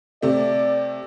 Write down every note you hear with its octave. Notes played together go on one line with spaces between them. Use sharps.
C3 A3 D5